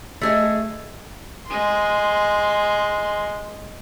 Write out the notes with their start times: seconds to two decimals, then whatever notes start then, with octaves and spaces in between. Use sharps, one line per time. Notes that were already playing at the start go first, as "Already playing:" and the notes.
0.21 A3 G#4 D#5
1.46 G#3 C6